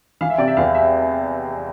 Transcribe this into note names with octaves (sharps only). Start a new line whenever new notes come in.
E3 F5
E5
C3 D5
E5
E2 F5
E5